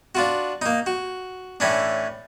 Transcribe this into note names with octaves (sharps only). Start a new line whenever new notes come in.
D4 F4 F#4
A#3 D#4
F#4
A2 E3 C#4 D4